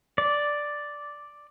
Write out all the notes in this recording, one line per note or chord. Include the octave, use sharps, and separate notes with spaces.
D5